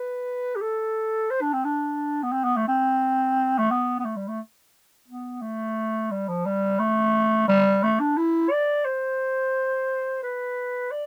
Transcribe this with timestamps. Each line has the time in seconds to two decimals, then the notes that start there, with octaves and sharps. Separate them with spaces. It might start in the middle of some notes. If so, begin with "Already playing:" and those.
Already playing: B4
0.56 G4
0.62 A4
1.30 C5
1.41 D4
1.53 C4
1.65 D4
2.23 B3
2.33 C4
2.45 B3
2.57 A3
2.68 C4
3.59 A3
3.71 B3
3.99 B3
4.05 A3
4.16 G3
4.28 A3
5.08 B3
5.42 A3
6.11 G3
6.28 F3
6.45 G3
6.79 A3
7.48 G3
7.83 A3
8.00 D4
8.17 E4
8.51 D5
8.85 C5
10.23 B4
10.91 D5